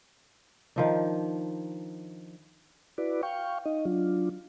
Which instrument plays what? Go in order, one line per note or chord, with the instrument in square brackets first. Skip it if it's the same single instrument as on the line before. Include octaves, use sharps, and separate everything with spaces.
[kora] D#3 F3 D4
[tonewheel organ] E4 F#4 B4 D5
F5 G5 C#6
D#4 D#5
F#3 D4 F4